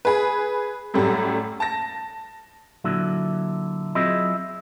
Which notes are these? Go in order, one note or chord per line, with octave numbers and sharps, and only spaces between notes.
G#4 B4
F#2 A2 G3 A3
A5 A#6
A#2 D3 F#3 E4
F#3 C4 E4 F4 G#4 D#5